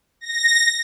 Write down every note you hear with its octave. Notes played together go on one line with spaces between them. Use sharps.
A#6